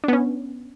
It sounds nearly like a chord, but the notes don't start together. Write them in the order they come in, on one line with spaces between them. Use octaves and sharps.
D4 B3 C#4